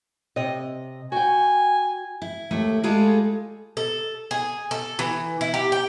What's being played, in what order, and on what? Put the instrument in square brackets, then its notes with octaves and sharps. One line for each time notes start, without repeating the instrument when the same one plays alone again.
[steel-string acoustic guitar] C3 D#5
[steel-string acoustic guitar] F#4 G5 [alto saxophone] G#5
[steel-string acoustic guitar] E4
D#2 A3 E4
G3 G#3 F4 G#4 A4
[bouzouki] A4
G#4
A4
E3
E4
G4
G5